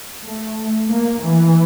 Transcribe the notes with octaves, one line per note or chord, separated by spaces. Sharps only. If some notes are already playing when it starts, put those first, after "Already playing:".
A3
A#3
E3